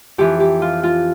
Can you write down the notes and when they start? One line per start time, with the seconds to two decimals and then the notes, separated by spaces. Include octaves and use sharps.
0.18 F2 E3 G4
0.40 G4
0.62 F4
0.83 F4